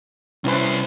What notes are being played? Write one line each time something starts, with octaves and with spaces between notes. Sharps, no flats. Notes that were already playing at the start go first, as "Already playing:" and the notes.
C2 C#4 E4 B4 C5